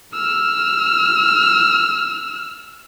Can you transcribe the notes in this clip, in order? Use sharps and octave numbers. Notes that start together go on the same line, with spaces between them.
E6 F6